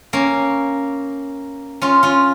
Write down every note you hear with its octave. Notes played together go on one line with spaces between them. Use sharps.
A#3 C#4
C#4 F4
C#4 F4